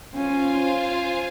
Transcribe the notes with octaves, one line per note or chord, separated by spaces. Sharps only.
C#4 F4 C5 F5 G#5